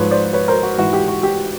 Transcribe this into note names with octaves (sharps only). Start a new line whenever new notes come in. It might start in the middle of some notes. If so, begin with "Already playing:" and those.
Already playing: G#2 F3 B4 C#5
C5 D5
B4 C#5
A#4 C5
F#4
G#2 E3 F#4
G4
F#4
G4